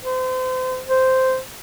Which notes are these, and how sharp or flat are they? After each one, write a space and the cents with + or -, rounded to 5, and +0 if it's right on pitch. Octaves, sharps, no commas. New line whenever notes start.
C5 -35
C5 -5